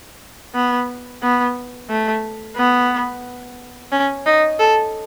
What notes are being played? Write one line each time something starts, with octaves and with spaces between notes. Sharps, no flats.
B3
B3
A3
B3
C#4
D#4
A4